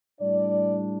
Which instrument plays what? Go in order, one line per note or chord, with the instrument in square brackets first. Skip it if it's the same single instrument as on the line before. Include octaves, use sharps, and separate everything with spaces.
[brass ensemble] A2 G3 D4 D5